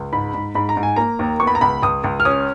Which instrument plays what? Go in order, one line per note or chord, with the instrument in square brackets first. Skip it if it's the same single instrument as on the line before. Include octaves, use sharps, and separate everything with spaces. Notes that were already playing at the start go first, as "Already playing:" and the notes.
Already playing: [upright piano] C#2
G#2 B5
G#2
G#2 B5
A#5
G#2
G#5
A#3 A#5
D#2
B3 C#6
B5
A#5
C#2 B5
C#2 D#6
C#2
F6
C#4 D#6